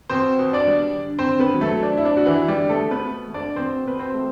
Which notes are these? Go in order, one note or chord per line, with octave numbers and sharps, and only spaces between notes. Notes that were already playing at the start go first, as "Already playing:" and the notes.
B2 C4 C5
B2
D4 D5
G3
D3
C4 C5
D3
B3 B4
F#3
A3 A4
A3 D4
E4
D4
D3 F#4
E3 E4
D3
G3 G4
B2 A3 A4
B3 B4
A3
A3
D4 D5
D5
B2 C4 C5
B2 B4
C4 C5
A3